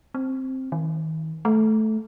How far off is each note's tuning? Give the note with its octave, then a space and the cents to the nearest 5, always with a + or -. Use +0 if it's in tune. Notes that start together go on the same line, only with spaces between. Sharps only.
C4 +5
D#3 +35
A3 -10